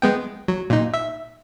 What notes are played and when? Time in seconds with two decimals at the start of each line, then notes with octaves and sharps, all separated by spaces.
0.02 G#3 B3 G5
0.48 F#3
0.70 A#2 D#4
0.94 E5